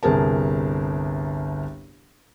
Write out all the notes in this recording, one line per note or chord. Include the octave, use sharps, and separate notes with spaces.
G1 C2 G#4 A#4 A5